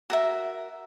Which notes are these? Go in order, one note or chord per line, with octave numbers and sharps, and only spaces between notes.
F#4 A#4 E5